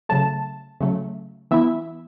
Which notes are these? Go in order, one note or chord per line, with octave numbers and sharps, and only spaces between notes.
C#3 F#3 A3 A5
C#3 F#3 A3
E3 B3 E4 E5